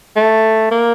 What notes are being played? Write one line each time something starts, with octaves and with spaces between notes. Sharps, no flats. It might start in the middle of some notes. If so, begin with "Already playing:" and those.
A3
A#3